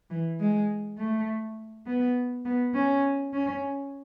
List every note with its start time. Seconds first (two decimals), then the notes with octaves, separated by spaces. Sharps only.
0.10 E3
0.40 G#3
0.98 A3
1.86 B3
2.45 B3
2.74 C#4
3.34 C#4